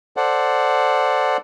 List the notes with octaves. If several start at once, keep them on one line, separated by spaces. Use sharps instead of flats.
A4 C5 D5 F#5